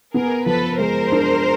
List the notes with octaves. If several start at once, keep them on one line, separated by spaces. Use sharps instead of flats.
B3 G#4 A#4
F3 A4 B4
G#3 A#4 C5
D4